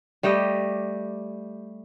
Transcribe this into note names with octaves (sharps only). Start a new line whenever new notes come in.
G3 A3 G4 D#5